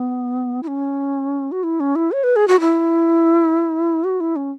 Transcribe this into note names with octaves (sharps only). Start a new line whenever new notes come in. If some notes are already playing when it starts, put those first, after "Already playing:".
Already playing: B3
E4
C#4
F#4
E4
C#4
E4
C#5
B4
G#4
F#4
E4
F#4
E4
C#4